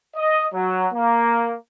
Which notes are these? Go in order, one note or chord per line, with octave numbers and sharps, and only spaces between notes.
D#5
F#3
A#3